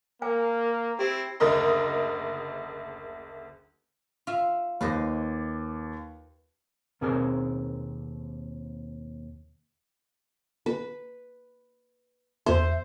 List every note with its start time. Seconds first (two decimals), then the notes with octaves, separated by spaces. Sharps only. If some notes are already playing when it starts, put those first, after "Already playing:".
0.22 A#3 A#4 G#5
0.99 C4 E4 G4
1.40 F#1 D2 A#4 D#5 C6
4.27 F4 E5
4.81 D#2 B4 C5 D#5
7.01 D#2 B2 C4 G#4 A#4 G#5
10.66 B4
12.46 E2 C5 E5